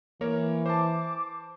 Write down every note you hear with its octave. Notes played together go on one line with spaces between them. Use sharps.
E3 A#3 A#4 C#5
C5 A5 D6